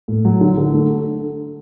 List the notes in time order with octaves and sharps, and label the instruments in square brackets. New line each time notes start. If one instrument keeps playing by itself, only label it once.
[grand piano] A2
F#3
D3
D3
A3